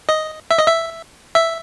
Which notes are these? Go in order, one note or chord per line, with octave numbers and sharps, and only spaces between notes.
D#5
E5
D#5
E5
E5